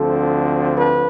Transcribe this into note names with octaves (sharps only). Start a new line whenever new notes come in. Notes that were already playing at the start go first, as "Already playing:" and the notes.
Already playing: D2 D3 F3 C4 A4
B4